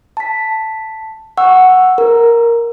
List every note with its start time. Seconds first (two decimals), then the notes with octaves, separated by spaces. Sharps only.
0.17 A5 B6
1.38 F#5 C#6 E6
1.98 A#4